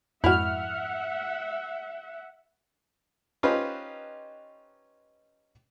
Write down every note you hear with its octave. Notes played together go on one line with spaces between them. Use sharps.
F2 G#2 E4 F#4 E5 F#5 F6
C#4 D#4 F4 G4 B4 C5